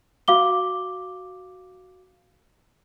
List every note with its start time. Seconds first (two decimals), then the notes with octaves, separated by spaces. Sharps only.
0.28 F#4 F5 D6 G7